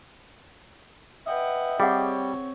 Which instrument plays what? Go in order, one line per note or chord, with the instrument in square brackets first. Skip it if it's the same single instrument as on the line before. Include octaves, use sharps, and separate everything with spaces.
[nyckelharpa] B4 F#5 [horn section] D#5 E5 G5
[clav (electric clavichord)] G3 [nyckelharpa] C4 C#5 [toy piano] G#4 F#5